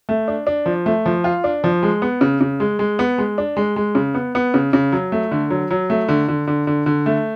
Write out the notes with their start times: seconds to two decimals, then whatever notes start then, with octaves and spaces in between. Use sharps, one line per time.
0.09 A3
0.28 D4
0.47 D4
0.66 F3
0.86 A3
1.06 F3
1.24 F4
1.44 D4
1.64 F3
1.83 G#3
2.02 B3
2.21 C#3
2.41 C#3
2.60 G#3
2.79 G#3
2.99 B3
3.18 G#3
3.38 D4
3.57 G#3
3.76 G#3
3.95 C#3
4.14 B3
4.35 B3
4.54 C#3
4.73 C#3
4.92 F#3
5.12 A3
5.31 D3
5.50 F#3
5.71 F#3
5.90 A3
6.08 D3
6.28 D3
6.47 D3
6.67 D3
6.86 D3
7.06 A3